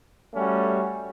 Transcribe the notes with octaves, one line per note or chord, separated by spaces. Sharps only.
G3 A3 C#4 F#4